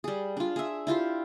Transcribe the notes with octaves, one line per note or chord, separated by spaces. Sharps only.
G3 G#4
D4 F4
G#4 E5
E4 F4 G4 C5